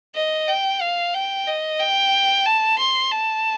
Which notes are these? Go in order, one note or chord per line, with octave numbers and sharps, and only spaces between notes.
D#5
G5
F5
G5
D#5
G5
A5
C6
A5